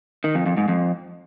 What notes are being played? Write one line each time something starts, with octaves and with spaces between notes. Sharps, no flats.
D#3
F2
F2
G#2
F2